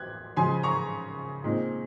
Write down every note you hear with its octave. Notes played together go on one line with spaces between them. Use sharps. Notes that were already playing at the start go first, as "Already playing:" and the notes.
Already playing: F#6 G#6
C#3 F3 G#3 G#5 C6
A#5 C#6
A#2 G#3 C4 D#4